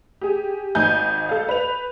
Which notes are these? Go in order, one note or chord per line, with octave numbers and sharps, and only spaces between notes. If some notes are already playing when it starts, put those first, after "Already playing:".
G4 G#4
G#1 D#4 G#5 G6
A4 F5
B4 F7